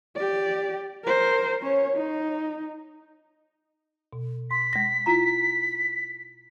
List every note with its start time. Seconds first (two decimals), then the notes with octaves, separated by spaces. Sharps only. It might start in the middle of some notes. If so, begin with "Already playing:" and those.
0.16 G4 D5
1.04 A#4 C5
1.62 C#4 C#5
1.97 D#4
4.13 B2
4.51 C6 B6
4.73 G#3 A#6
5.06 E4 F4 A#5